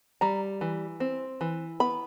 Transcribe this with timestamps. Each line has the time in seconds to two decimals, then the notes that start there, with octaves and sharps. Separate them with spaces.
0.21 G3 A#5
0.61 E3
1.00 C4
1.41 E3
1.80 B3 B5